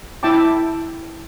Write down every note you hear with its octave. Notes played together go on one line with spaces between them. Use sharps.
E4 E5 G5 A5 D6